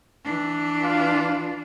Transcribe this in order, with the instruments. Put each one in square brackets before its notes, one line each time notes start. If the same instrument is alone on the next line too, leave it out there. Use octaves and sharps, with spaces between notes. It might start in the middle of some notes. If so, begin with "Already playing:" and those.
[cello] E3 D4
[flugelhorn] F4